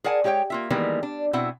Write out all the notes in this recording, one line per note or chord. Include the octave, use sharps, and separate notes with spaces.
G#4 A#4 D5 F#5 G#5 A5
G#3 G4 C#5 E5 G5
A#3 F4 E5
D#3 E3 G3 G#3 A#3 B3
D4
B2 C4 E4 E5 F#5